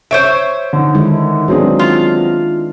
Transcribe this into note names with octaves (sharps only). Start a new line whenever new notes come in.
C5 C#5 E5 D7
D3 D#4
D#3 G#3 E4
F#3 G#3 B3 C4 D4 G#4
F4